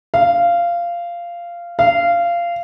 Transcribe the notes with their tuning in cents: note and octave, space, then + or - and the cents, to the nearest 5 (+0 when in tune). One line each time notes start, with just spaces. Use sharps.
F5 -15
F5 -20